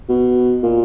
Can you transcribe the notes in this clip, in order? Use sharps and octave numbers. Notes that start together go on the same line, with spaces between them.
B2
A#2